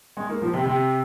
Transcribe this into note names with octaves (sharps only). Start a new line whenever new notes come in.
G#3
A#3
F3
C3
C3